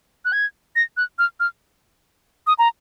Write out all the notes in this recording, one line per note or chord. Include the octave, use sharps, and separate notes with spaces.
F#6
G#6
A#6
F#6
F6
F6
D#6
A#5